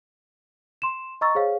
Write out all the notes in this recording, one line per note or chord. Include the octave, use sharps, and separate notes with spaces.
C6 E7
D#5 A#5 C#6 E6 A6
G#4 C5 C#5 F5